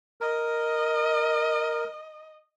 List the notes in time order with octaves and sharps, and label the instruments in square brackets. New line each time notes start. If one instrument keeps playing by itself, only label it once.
[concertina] A#4 [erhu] D#5